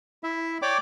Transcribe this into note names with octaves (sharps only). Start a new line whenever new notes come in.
E4 E5
C#5 D5 G5 D6